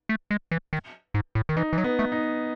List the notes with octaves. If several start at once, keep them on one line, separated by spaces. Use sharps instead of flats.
A3
G#3
E3
D#3
G#2
A2
D#3
E3 D#4
E3
F#3
B3
A3
D#4